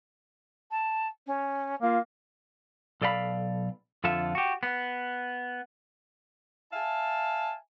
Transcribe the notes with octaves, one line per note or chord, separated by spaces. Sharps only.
A5
C#4
A#3 F4
B1 A4 D5 F5 F#5 B5
F2 D3 F4 A4 E5
F#4 G4
B3
E5 F5 G#5 A5